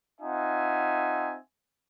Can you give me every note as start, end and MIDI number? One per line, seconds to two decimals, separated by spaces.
0.21 1.37 60
0.21 1.37 63
0.21 1.37 65
0.21 1.37 76
0.21 1.37 78
0.21 1.37 80